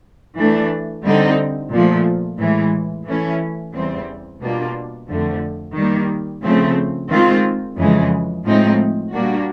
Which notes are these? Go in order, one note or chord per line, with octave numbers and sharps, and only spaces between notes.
E3 A3 D4
D3 G3 C4 D#4
A#2 F3 A3
A2 E3 G#3
E3 A3 C#4 E4
E2 C#3 E3 G3 C4
B2 G3 A#3 D4 F4
F2 D3 F3 A3
D#3 G3 A#3
C#3 F3 A3 C4
D#3 G#3 C4 F4
F2 C#3 E3 G#3
A2 F3 G#3 C4 D#4
A#2 G3 A#3 D4 F#4